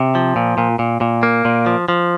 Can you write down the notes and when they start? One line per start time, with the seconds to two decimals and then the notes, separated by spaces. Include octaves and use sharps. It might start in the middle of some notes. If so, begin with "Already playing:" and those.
Already playing: C3
0.15 F3
0.36 A#2
0.58 A#2
0.79 A#2
1.01 A#2
1.23 A#3
1.45 A#2
1.66 F3
1.88 F3